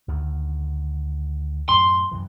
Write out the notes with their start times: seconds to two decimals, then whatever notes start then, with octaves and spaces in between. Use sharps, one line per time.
0.08 D2 D3 D#3
1.69 F#2 A2 C6
2.11 F#2 C3 E3